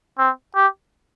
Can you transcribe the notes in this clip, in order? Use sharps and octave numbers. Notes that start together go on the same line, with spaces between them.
C4
G4